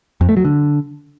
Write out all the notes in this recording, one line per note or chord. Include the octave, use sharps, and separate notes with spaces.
F2
A3
F#3
D3